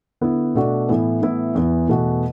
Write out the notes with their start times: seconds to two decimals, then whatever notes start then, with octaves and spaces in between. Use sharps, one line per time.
0.21 D3 B3 E4
0.55 B2 A3 D4 F#4
0.89 A2 E3 B3
1.22 A2 E3 B3 E4
1.55 E2 E3 B3
1.89 E2 B2 A3 F#4